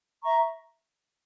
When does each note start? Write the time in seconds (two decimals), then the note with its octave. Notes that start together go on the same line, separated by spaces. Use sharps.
0.22 E5 A#5 C#6